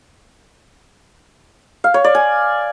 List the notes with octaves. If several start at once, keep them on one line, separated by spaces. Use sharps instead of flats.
F5
C#5
D5
G#5